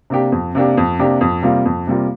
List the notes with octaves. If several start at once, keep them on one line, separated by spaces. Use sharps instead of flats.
C3 A#3 D4 G4
F2
C3 A#3 D4 G4
F2
C3 A#3 D4 G4
F2
C3 G3 A#3 F4
F2
C3 G3 A#3 F4